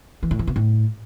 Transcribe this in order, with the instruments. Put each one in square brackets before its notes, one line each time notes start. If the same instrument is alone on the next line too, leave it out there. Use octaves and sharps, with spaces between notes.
[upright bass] E3
A2
E3
B2
A2